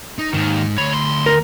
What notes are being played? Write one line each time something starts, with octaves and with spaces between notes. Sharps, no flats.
D#4
D#2 G#2 D#3 D#4
D2 C#5 B5
C6
A#4